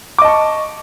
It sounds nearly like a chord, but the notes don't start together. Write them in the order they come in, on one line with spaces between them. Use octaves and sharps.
D6 D#5 A5 C#6